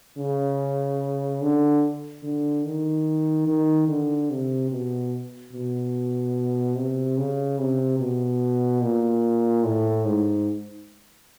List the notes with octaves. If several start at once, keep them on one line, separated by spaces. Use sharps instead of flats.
C#3
D3
D3
D#3
D#3
D3
C3
B2
B2
C3
C#3
C3
B2
A#2
A2
G#2